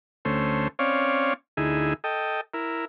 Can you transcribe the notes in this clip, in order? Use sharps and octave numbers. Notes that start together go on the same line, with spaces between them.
D2 A3 C#4 C5
C4 C#4 C#5 D5 F5
D2 D#4 E4 G#4
A4 D#5 G5
E4 A#4